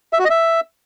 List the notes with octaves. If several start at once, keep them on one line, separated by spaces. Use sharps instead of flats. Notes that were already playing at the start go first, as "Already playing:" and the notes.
E5
F#4
D#5
E5